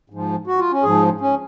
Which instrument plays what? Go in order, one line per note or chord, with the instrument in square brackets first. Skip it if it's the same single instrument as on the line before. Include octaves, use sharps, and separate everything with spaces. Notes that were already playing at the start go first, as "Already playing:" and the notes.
[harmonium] G#2 F3
F#4
F4
C#4
G#2 F3 G#4
C#4